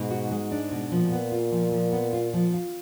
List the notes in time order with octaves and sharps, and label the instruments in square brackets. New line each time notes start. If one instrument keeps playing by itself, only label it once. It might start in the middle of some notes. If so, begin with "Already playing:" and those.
Already playing: [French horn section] G#2 [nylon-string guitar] B2
[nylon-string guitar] F#4
G#3
D4
B2
[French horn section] A#2 [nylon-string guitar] F3
[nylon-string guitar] B3
F4
F3
F3
B3
F4
F3
F4